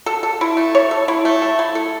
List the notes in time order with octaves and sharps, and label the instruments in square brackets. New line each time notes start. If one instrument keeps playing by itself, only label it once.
[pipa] A4
A4
E4
A3
C#5
A4
E4
A3
A4
E4
A4